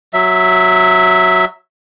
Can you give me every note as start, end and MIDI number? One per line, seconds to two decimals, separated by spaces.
0.13 1.45 54
0.13 1.45 76